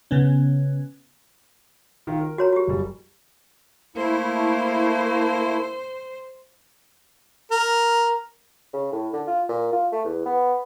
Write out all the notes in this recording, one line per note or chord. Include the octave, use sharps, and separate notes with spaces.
C#3 B3 C#4
D#3 F4
A#4
F#4 C#5 A#5
F#4 G4
F#1 G3
A3 A#3 E4 C5
A#4
C#3
A2
D3
F4
A#2
F4
A3
E2
B3